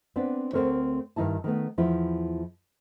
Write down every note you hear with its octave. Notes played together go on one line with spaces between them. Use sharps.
B3 C4 D4 D5
D2 D3 C4 A4 A#4 C#5
G2 D#3 D#4 E4 A5
D#3 A3 B3
E2 F3 E4